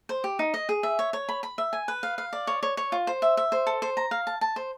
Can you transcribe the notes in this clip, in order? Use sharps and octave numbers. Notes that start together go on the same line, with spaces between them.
C5
G4
D#4
D#5
G#4
E5
C#5
C#5
B5
B5
E5
G#5
B4
F5
F5
D5
C#5
C#5
C#5
F4
C5
E5
E5
C5
A4
C5
A#5
F5
A5
A5
C5